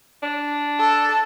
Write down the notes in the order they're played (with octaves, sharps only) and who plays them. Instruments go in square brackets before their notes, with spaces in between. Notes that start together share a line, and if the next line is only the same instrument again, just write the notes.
[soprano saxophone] D4
[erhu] A4